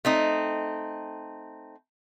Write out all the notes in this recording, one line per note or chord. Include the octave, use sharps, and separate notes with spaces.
A3 C4 D#4